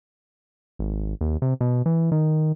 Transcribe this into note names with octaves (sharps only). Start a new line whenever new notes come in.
G#1
D#2
C3
B2
E3
D#3